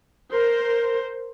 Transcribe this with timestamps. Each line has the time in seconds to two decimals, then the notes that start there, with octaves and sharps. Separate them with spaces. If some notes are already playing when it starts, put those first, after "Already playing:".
0.32 A#4 C5